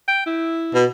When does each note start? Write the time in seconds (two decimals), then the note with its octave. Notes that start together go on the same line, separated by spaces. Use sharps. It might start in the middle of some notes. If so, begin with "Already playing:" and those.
0.08 G5
0.26 E4
0.74 B2